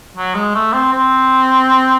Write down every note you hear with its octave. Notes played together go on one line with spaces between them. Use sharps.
F#3
G#3
A3
C4
C4